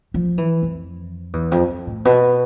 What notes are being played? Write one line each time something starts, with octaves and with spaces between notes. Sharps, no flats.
F3
E3
F2
E2
F2
F2
A2
B2